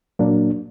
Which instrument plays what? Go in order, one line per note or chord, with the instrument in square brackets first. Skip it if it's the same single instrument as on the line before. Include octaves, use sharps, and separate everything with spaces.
[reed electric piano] A#2 F#3 A#3 D4